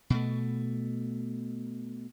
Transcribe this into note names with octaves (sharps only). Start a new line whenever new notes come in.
B2 A3